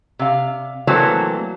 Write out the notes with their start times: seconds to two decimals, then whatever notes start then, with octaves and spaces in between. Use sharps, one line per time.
0.19 C3 F5
0.87 E3 F#3 A3 A#3 C4